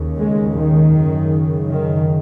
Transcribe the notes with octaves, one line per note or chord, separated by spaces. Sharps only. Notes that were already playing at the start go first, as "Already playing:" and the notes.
Already playing: D#2 C#3
G#3
D#3
F#2 C#3
D#3